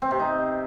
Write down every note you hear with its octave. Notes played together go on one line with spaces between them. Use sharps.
C4
C3
D#4